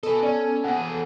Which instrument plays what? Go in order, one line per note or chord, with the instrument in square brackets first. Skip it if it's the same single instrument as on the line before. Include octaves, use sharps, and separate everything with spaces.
[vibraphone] B3 G#5 [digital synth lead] A4 [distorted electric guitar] B4 D#5
[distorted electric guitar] C#4 [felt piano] D5
[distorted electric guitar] B2 G#4 [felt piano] F#5